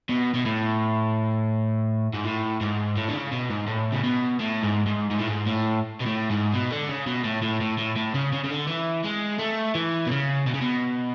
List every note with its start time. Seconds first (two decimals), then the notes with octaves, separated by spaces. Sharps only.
0.10 B2
0.35 B2
0.46 A2
2.14 G#2
2.25 A2
2.61 G#2
2.96 A2
3.08 D3
3.14 C#3
3.32 B2
3.50 G#2
3.67 A2
3.93 C#3
4.04 B2
4.40 A2
4.63 G#2
4.87 G#2
5.11 G#2
5.19 A2
5.27 G#2
5.46 A2
6.00 B2
6.06 A2
6.30 G#2
6.53 B2
6.72 D3
6.89 C#3
7.07 B2
7.25 A2
7.43 A2
7.61 A2
7.78 A2
7.96 A2
8.15 C#3
8.33 C#3
8.44 C#3
8.50 D3
8.67 E3
9.04 G#3
9.39 A3
9.75 E3
10.06 B2
10.11 C#3
10.47 B2
10.54 C#3
10.61 B2